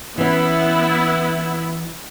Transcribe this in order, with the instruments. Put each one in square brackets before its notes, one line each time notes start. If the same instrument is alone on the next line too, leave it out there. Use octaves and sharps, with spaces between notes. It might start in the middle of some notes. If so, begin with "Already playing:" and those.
[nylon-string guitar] E3 C#4 [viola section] B3 E4